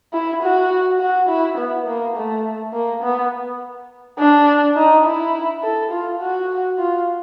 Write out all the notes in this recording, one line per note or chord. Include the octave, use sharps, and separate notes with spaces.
E4
F#4
F#4
E4
B3
A#3
A3
A#3
B3
D4
D#4
E4
A4
F4
F#4
F4